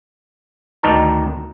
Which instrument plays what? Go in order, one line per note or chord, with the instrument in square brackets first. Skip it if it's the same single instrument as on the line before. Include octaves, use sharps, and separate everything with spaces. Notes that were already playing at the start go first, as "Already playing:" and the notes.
[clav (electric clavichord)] D2 D#3 D4 D#4 A#4 A5